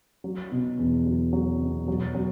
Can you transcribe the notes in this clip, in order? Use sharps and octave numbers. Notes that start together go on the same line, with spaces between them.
F#3
B2
E2
F#3
F#3
B2
F#3
F#3